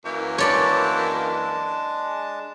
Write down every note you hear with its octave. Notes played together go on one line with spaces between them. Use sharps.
F#2 E3 A#3
G#3 D4 C#5 D5 A5 B5